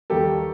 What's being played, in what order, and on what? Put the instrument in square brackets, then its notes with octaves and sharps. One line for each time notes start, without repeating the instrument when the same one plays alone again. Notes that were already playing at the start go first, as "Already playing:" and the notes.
[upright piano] D#2 D#3 G3 G4 A4